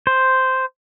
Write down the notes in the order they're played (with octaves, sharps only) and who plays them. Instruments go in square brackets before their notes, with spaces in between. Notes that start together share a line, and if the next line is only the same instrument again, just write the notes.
[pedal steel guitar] C5